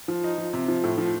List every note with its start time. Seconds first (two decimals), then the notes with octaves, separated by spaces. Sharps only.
0.08 F3
0.24 D#4
0.38 F3
0.53 C3
0.68 F3
0.84 A2
0.98 F3